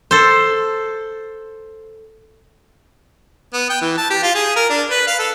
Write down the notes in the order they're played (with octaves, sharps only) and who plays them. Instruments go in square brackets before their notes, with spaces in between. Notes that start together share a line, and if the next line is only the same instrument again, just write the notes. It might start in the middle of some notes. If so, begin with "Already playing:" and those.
[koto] A4 C5
[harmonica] B3
G5
E3
A5
G4
F4
G#4
A#4
D4
B4
F5
A4